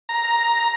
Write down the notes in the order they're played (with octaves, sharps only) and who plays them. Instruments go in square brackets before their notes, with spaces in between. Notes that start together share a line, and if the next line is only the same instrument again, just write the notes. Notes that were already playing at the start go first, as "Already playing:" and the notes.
[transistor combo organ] A#5